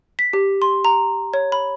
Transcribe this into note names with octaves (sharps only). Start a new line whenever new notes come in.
B6
G4
C6
A#5
C#5
B5